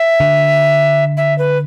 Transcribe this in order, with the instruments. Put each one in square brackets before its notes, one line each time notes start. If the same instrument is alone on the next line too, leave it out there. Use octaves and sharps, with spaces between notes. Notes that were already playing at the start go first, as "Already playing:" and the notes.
Already playing: [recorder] E5
[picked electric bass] D3
[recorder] E5
B4